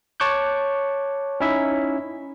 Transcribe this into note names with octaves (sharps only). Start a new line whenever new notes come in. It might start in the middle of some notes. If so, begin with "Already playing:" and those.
C#5 A5 C#6 D6 F#6 G6
C#4 D#4 E4 E5